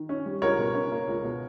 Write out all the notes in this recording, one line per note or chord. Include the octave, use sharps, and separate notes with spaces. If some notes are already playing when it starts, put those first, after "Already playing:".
Already playing: D#3
C#4
G3
C#2 A#4 C#5
B2
C#4
A#3
C#2
B2